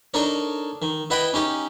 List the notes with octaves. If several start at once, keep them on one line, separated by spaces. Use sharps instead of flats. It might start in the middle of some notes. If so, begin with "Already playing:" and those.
D4 D#4 A4 A#4 C#5
D#3
E4 B4 D#5 F#5 G5 B5
C#4 D#4 G4